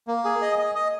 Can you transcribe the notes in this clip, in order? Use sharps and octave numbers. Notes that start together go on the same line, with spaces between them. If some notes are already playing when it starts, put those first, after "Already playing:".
A#3
G#4
D#5
D#5
D#5